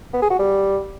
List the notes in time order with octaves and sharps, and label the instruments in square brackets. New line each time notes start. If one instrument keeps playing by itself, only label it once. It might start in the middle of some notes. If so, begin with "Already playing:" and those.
[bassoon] B3
G#4
F#4
G3